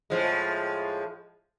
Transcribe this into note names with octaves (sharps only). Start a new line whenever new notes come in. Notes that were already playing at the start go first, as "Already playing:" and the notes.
A2 F3 G#3